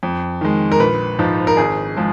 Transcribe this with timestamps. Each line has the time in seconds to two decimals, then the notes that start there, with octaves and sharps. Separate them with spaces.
0.03 F2
0.41 D#3 G#3
0.72 A#4
0.80 A#1 B4
1.19 G#2 F3
1.47 A#4
1.57 G#1 G#4
1.97 F3 G#3